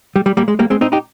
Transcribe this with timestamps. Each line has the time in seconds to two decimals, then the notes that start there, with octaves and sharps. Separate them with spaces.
0.16 G3
0.26 G3
0.37 G3 A#3
0.48 G#3
0.59 G3 A#3
0.70 G#3 C4
0.81 C4 D#4
0.92 D#4 G4